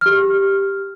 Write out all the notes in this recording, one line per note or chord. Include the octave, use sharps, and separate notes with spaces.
G4 F6